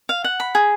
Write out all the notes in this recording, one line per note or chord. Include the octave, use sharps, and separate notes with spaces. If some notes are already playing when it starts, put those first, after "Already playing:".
F5
F#5
B5
G#4